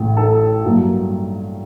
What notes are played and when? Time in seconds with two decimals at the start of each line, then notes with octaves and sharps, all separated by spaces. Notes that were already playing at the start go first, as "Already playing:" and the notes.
Already playing: A1 A2 A3
0.17 A4
0.64 G2 F#3 A#3